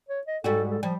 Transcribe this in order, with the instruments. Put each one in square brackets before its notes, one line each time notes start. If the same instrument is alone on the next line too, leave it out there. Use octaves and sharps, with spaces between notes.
[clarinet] C#5
D#5
[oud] G#2 G3 F#4 [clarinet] A4
[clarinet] A4
[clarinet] F3 [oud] G3